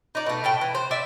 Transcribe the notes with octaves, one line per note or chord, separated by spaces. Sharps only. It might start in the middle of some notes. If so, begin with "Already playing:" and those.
D#4 D5
B2 A3
A2 A3 G5
E3
C5
D5 E5